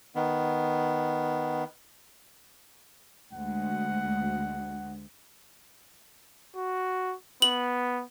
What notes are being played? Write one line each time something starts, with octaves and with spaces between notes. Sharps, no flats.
D#3 B3
D2 G#3 F#5
F#4
B3 F#7